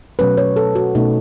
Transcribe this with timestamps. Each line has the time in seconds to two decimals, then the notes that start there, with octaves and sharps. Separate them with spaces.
0.19 B2 F#3 A3 C#4 B4
0.37 C#5
0.56 A4
0.75 F#4
0.95 B2 A3 C#4 D#4